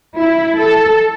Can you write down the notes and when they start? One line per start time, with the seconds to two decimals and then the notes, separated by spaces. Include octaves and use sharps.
0.20 E4
0.59 A4